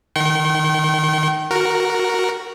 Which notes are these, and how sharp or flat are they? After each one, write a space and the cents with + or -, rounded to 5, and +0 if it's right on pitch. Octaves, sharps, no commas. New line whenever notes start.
D#3 +0 G5 -35 C#6 -45
F#4 +0 A#4 +0